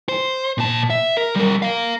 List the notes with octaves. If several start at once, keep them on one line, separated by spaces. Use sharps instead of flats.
C5
A#2 A5
E5
A#4
G3 A#4
A#4 F5